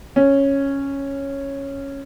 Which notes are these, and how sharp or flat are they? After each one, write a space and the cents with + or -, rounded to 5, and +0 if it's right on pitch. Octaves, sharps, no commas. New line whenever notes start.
C#4 -5